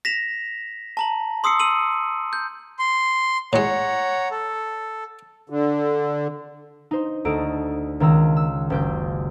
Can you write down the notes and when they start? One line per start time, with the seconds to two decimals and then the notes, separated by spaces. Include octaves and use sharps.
0.05 A#6 B6 E7 F7
0.97 A5 A#5 F#7
1.44 C6 D#6 E6 C7 C#7
1.60 E6 D#7 F#7
2.33 G6
2.79 C6
3.53 A2 G#3 C#5 F#5 A#5
4.31 A4
5.50 D3
6.91 D#4 C5
7.25 D2 A4 D#5 A#5 D7
8.00 C#2 D#3 A#5 E6
8.36 E6
8.70 F#1 G4 G6